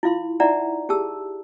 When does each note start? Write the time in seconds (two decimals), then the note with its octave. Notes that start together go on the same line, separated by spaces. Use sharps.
0.03 E4 F4 F5 C6
0.40 D#4 E4 D5 E5 F#5 A#5
0.89 G4 G#4 A5 E6